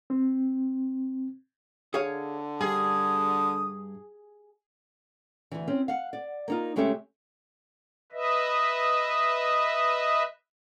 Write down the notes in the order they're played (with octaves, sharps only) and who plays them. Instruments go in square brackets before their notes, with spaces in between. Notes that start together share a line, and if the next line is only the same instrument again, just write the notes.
[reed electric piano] C4
[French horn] D3 [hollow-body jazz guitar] G#4 C#5 F5
[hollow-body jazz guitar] G2 [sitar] G#4 [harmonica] D#6
[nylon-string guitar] D2 E3
C4 C#4
F5 F#5
D5
A#3 D#4 F4
C#3 G#3 A3 C#4 G4 E5
[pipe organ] B4 D#5 E5